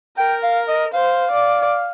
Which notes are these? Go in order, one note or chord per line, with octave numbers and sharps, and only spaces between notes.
A#4 G5
F5
D#5
C5 F5
D5